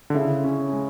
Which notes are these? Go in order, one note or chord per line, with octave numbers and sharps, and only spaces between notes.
D3
C#3 E4
C#4
G#3